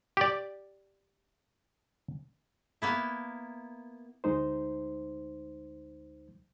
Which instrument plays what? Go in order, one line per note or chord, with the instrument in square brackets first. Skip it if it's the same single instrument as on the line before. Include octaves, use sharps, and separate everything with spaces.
[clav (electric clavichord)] G4 D5
[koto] A#3 B3 E4
[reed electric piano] D2 G#3 D#4 C5